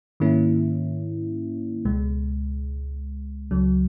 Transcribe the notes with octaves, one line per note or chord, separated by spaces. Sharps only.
G#2 D#3 A#3 C#4 E4
C#2 B2 G#3
C#2 C#3 F#3